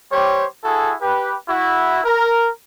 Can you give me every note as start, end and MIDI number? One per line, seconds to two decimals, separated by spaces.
0.11 0.46 55
0.11 0.46 67
0.11 0.46 72
0.11 0.46 73
0.63 0.93 64
0.63 0.93 66
0.63 0.93 68
0.63 0.93 69
1.01 1.35 67
1.01 1.35 71
1.48 2.00 64
1.48 2.00 66
2.04 2.49 70